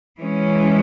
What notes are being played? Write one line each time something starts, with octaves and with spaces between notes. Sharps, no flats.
E3 G#3 C#4